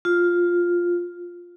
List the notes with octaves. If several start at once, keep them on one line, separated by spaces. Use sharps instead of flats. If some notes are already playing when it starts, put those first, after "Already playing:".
F4